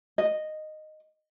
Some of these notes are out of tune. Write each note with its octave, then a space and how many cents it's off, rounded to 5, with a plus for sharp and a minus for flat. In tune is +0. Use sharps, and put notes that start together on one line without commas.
D#5 -10